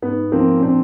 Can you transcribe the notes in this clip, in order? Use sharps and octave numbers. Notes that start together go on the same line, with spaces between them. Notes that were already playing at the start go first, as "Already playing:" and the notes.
G#2 B3
F3 A#3 C4
C#4
A#2 C4 D4